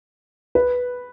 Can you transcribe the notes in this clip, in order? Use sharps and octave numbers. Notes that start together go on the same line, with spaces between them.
B4